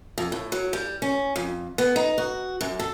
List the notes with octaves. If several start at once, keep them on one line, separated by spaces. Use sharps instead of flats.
F2
A2
F#3
G3
C#4
F2
B3
D#4
F#4
F#2
A4